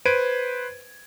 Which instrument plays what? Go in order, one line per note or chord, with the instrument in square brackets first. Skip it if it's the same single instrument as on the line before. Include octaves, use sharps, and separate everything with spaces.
[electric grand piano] B4 C5 G#6 D7 D#7